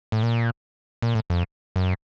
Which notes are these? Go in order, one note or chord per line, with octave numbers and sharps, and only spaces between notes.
A2
A#2
A#2
A2
F2
F#2